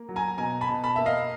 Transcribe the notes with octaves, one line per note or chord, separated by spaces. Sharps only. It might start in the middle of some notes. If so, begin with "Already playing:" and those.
Already playing: A#3
F#3
G#5 A#5
B2 G#5 A#5
A5 B5
B2
A5 B5
A#3 E5
D#5 F5